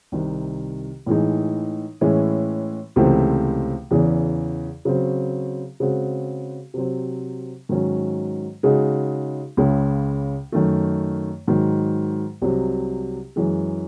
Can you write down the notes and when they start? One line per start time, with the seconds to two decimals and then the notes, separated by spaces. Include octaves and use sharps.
0.12 C2 C3 D#3
1.06 A2 E3 G#3 D#4
2.01 A2 E3 G#3 C#4 E4
2.96 C#2 C3 E3 A3 C4
3.91 E2 C#3 E3
4.85 C#3 F#3 C4
5.80 C#3 G#3 C4 F#4
6.74 C3 F#3 C4
7.69 G#2 D#3 F#3 C#4
8.63 C#3 G#3 D#4 F#4
9.57 C#2 C#3 G#3
10.52 F#2 D#3 A3
11.48 G#2 D#3 F#3
12.42 C2 C3 F#3
13.36 F#2 E3 G#3